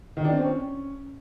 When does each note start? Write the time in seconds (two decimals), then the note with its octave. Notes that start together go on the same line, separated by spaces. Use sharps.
0.17 D#3
0.25 D4
0.32 C4
0.40 C#4